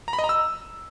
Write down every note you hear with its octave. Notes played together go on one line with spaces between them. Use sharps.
A#5
B5
D#5
A#5
E6